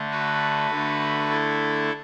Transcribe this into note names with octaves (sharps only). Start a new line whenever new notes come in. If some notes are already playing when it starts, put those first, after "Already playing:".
Already playing: D3 A3
F#4 B4
D3 A3
E4 A4